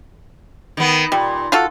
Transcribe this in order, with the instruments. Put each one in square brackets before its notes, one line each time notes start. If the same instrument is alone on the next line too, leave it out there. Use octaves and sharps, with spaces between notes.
[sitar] D#3 B3
[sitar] A#2 [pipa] G3
[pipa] F4 F#4 A4